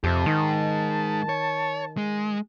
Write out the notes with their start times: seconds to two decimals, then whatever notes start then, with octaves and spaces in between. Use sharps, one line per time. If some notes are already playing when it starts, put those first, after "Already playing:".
0.04 F2 C4 G4 A5
0.26 D#3 G#3 D#4
1.29 C#5
1.97 G#3